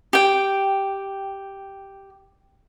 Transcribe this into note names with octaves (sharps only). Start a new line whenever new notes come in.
G4 G5